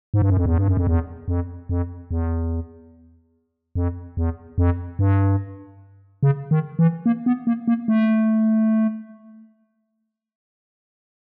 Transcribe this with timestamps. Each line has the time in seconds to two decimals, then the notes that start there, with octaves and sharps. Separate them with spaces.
0.14 G#2
0.22 G2
0.30 F#2
0.37 F2
0.46 E2
0.58 G2
0.68 F#2
0.77 F2
0.87 E2
1.28 F2
1.69 F2
2.11 E2
3.75 F2
4.17 E2
4.58 F2
4.99 G2
6.23 C#3
6.51 D#3
6.79 E3
7.06 A#3
7.26 B3
7.47 A#3
7.68 A#3
7.88 A3